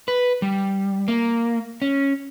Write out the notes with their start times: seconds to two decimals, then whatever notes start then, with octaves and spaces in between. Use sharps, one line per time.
0.08 B4
0.42 G3
1.08 A#3
1.82 C#4